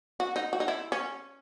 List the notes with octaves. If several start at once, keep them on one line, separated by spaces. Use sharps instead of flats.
F#4
D#4
F#4
D#4
E4
C#4